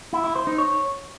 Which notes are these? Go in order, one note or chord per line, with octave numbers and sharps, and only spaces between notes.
E4
E4
C5
D#4
C#5